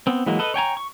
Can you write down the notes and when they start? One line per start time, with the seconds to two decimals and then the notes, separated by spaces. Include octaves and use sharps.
0.07 B3 C4
0.26 E3 F#3 G#3 A#3
0.39 A4 B4 D#5
0.54 C#5 G5 G#5 A#5
0.77 C#6